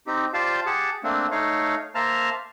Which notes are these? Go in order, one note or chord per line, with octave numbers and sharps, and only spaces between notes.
C4 D#4 G4
F4 G4 C5 D5 F5 A5
G4 G#4 F#5 A5
A3 A#3 C4 D4
A3 D#4 C#5 F5
A#3 C5 E5 A5 A#5 F6